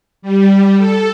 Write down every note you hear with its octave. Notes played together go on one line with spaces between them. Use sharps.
G3
A4